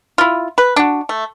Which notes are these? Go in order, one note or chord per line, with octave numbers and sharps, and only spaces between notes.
E4 F4
B4
D4 F#4
A3